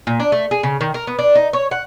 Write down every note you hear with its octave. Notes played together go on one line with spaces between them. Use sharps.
A#2
D4
A3
G#4
C#3
D#3
A#4
B3
D4
D#4
C#5
F#5